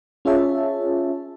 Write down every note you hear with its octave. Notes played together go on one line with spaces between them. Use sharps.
C#4 F4 G#4 C#5 E5 A5